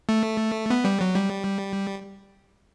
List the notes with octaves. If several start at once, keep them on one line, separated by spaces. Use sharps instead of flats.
A3
B3
G3
F#3
G3